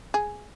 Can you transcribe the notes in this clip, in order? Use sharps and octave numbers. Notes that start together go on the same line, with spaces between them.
G#4